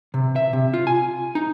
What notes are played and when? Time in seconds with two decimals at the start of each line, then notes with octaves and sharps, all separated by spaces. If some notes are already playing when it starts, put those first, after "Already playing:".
0.14 C3
0.36 E5
0.53 C3
0.74 F4
0.87 G#5
1.35 D#4